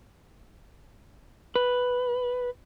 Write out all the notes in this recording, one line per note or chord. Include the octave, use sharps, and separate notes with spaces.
B4